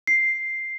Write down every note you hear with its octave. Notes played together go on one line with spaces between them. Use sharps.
C7